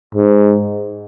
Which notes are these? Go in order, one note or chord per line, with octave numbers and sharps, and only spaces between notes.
G#2